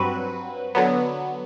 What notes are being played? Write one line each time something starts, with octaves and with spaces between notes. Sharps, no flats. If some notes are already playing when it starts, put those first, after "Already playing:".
Already playing: G2 F#3 C4 F#4 B4
D3 F#3 B3